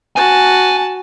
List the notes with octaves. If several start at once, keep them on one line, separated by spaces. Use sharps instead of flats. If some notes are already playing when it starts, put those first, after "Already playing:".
F#4 G#5 A5